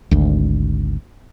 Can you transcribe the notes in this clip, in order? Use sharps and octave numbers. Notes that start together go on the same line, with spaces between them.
G#1 D2